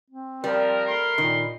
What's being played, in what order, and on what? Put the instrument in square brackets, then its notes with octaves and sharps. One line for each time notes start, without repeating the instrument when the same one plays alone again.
[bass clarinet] C4
[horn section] F3 [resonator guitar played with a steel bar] G3 [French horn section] A#4
[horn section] A3 B5 C6
[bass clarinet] A#2 [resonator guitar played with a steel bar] D#3